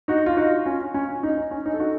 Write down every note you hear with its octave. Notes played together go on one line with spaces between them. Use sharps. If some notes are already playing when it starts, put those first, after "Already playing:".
D#4 F#4
F4
D#4 F#4
C#4 F4
C#4
D#4
D#4
C#4
D#4
A4
D#4 F#4